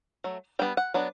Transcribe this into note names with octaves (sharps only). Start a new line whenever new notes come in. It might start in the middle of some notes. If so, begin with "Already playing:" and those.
F#3 A3
G3 B3 D4 G5
F#5
F#3 B3 D4